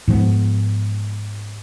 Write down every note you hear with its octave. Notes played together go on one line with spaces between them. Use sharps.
G#2 F3 G#3 B3